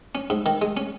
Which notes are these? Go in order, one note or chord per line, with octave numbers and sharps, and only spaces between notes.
C#4
G#2
D#3
G#3
C#4